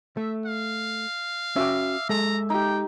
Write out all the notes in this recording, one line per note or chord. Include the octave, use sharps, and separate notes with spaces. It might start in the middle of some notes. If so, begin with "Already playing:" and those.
A3 E5
F5
C#4 F#4 E5 G5 D6
G#3 A4 A#5
D#4 G4 G5